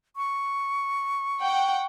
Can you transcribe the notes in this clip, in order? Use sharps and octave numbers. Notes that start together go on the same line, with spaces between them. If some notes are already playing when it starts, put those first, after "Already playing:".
C#6
F#5 G5